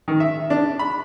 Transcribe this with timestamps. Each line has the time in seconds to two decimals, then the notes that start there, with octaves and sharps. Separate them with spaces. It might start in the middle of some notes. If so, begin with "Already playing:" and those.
0.08 D#3
0.20 E5
0.50 D4
0.79 B5